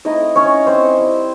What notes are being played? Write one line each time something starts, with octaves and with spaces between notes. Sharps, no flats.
A3 C4 D#4 E4 D#5
C#4 C#5
C4 C5
G3 C4 E4